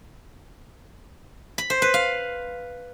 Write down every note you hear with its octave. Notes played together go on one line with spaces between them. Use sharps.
B5
C5
B4
F5